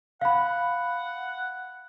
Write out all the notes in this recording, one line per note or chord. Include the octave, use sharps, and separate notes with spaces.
F5 F#5 B5